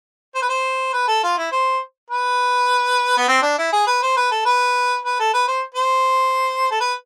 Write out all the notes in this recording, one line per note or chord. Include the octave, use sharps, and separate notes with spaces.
C5
B4
C5
B4
A4
F4
E4
C5
B4
B3
C4
D4
E4
G#4
B4
C5
B4
A4
B4
B4
A4
B4
C5
C5
A4
B4